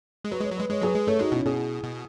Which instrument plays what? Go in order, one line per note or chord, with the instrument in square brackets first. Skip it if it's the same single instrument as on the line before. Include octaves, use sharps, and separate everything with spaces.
[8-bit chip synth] G#3
[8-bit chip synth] F#3 [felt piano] B4
[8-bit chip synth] G#3 [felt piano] C#5
[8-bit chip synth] F#3
[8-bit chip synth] G#3 [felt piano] B4
[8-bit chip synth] G#3 [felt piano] C#5
[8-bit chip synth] F#3 [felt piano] G#4 B4
[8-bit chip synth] G#3
[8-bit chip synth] A3 [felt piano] A4 C#5
[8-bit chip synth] G#3 [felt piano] D#4 F#4
[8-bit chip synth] B2 [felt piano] C#4 E4
[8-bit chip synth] B2 [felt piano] E4 G#4
[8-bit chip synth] B2